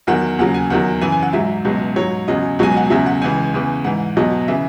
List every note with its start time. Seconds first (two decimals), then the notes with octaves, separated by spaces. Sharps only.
0.07 E2 D#3 F#3 F#5
0.39 D#2 C#3 F#3 F#5
0.54 G#5
0.70 E2 D#3 F#3 F#5
1.02 F#2 C#3 E3 G#5
1.12 G#5
1.23 F#5
1.33 G#2 F#3 E5
1.65 C#2 B2 F#3
1.96 G#2 F#3 C#5
2.28 E2 C#3 F#3 D#5
2.59 C#2 B2 F#3 G#5
2.77 F#5
2.90 E2 C#3 F#3 E5
3.06 F#5
3.22 C#2 C#3 E3 G#5
3.54 E2 C#3 E3
3.85 G#2 E3 F#5
4.16 E2 B2 F#3 D#5
4.48 C#3 E3 E5